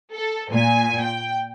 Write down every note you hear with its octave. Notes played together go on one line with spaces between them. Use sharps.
A4
A#2 G#5
G5